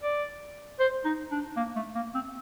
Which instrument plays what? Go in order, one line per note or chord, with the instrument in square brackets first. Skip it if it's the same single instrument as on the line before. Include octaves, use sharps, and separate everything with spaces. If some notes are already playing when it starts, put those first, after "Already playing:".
[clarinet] D5
C5
D#4
D4
A#3
A3
A#3
C4